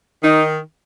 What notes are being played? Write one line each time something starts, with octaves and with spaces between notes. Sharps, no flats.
D#3 D#4